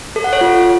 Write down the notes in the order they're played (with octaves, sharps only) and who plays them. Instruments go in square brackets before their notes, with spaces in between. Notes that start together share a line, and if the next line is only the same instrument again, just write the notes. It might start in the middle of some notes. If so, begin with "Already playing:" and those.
[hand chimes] A4
F#5
C#5
F4